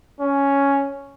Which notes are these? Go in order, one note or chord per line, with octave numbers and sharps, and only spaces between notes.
C#4